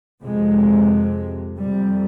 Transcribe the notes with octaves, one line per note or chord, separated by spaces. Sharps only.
F2 C3 G#3
F2 C3 G3